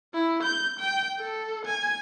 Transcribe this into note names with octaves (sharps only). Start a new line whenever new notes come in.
E4
G6
G5
A4
G#5